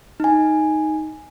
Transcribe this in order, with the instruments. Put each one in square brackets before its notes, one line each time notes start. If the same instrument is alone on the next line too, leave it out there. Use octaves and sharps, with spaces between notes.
[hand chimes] D#4 G#5